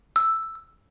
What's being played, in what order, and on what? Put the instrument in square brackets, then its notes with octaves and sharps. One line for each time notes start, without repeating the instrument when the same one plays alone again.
[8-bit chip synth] E6